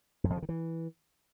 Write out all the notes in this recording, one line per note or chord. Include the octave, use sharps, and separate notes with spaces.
F#2
F2
C#3
D#3
E3